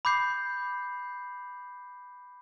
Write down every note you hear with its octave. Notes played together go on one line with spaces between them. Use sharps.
B5 D6 G6 C7